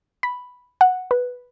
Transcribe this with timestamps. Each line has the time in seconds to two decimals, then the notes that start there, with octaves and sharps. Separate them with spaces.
0.23 B5
0.81 F#5
1.11 B4